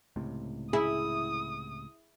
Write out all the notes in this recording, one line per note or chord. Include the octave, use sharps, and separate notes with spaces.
C#2 A2 C3
E4 G#4 D#6